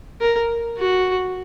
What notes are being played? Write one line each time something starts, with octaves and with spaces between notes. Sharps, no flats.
A#4
F#4